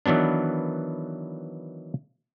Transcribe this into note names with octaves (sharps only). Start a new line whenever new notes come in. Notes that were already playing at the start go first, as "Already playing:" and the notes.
D#3 E3 F#3 B3 D4